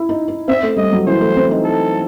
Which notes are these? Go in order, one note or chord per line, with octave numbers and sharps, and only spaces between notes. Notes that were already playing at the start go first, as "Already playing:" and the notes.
Already playing: E4
D#4
D#4
C4 E5
A3
G3 D#5
F#3
E3 C5
A3
C4
D#4
A4